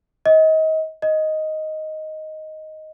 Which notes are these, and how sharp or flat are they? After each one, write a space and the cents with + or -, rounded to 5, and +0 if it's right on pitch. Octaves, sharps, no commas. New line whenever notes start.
D#5 +30
D#5 +5